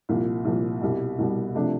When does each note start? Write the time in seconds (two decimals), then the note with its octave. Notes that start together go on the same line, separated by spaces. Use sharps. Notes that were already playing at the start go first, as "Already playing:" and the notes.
0.09 C2 A#2 F3
0.45 C2 A#2 F3
0.81 C2 B2 G3
1.18 C2 B2 G3
1.55 C3 F3 A3 D4